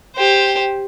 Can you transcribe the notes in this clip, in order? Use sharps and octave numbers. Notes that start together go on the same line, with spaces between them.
G4 C5